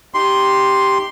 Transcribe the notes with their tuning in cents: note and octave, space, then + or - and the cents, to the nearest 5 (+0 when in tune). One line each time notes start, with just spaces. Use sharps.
D#4 +0 G4 +0 C6 +0